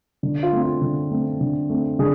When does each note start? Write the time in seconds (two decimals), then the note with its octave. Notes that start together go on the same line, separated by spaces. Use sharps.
0.23 D3
0.43 F4
0.52 A3 C4
0.62 F4
0.81 D3
1.11 A3 C4
1.41 D3
1.69 A3 C4
1.99 D3 G#4